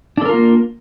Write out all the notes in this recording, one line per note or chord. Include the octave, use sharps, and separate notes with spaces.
A#3 D4 F4 A4 A#4